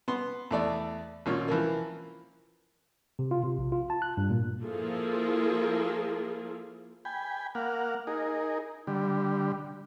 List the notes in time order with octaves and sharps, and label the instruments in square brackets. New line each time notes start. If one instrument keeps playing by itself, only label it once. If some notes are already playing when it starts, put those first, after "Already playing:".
[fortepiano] B3 C6
E2 A3 D5
G#1 A#2 C#4
E3 F3 A#3
[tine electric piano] C3
F4
C3
A#1
F4
A5
F#6
G2
A#2
[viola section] F3 A#3 E4 F4 G#4 A4
[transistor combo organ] G5 G#5 B5
A#3 F5 F#5
D#4 G#4 A#4
D3 G3